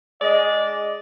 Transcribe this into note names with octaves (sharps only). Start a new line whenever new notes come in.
G#3 D4 D5 D#5